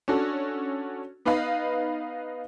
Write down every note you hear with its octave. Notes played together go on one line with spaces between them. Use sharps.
C#4 D4 F#4 A4
B3 D#4 B4 D#5 F5 B5